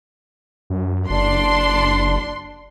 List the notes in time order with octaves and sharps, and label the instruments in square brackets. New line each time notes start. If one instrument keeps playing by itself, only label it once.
[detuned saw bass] F#2
[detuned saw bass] F#1 [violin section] D4 C6